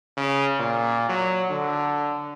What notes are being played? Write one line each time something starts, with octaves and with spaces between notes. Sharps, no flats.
C#3
A#2
F#3
D3